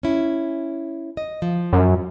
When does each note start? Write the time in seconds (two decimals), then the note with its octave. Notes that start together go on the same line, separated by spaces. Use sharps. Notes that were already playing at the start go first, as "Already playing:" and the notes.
0.03 C#4 E4
1.17 D#5
1.42 F3
1.73 F#2